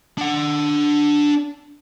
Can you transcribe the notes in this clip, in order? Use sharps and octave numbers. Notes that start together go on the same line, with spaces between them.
D4 F#5